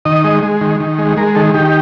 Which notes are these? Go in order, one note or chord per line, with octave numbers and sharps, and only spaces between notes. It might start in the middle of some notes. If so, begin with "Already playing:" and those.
D#3 D#5
G#3
G#3
D#3
D#3
G#3
G#3 A#4
D#3 A4
D#3 G4